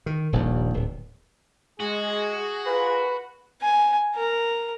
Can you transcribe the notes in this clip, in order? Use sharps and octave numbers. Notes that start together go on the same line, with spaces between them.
D#3
D#1 A#1 D#2
D1
G#3 F#4 G#4
F4 A#4 B4
G#5
A#4